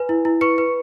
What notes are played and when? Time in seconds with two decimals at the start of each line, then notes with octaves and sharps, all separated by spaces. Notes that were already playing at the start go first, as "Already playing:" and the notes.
Already playing: B4 G#5
0.09 E4
0.25 E4
0.41 B4 C#6 C#7
0.58 B4